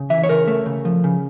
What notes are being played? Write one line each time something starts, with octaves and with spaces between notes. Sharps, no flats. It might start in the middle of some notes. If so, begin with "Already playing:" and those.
Already playing: C#3
E3 E5
C#5
C#3 A#4
A3
C#3
F3
C#3